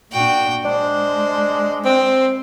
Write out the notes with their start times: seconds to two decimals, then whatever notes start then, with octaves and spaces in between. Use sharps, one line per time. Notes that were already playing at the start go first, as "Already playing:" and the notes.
0.12 A#2 D4 F#4 G5
0.65 G#3 D4 C5
1.85 C4 C5